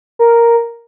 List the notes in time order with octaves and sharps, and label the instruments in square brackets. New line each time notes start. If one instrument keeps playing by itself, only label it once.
[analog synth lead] A#4